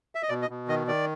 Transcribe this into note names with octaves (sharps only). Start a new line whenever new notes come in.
E5
D#5
B2 D5
D#5
B2
D#3 D#5
D#3 D5